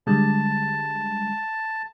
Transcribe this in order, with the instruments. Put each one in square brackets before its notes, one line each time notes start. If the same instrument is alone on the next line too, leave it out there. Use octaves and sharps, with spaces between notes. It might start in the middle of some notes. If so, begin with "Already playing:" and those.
[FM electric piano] D3 G3 G#3 [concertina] A5